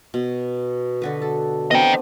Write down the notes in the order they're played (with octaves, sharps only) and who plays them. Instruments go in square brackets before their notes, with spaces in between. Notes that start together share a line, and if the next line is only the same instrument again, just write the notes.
[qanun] B2
D3 F#4 B4
A4
[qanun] B3 C4 D4 [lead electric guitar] D#5 G5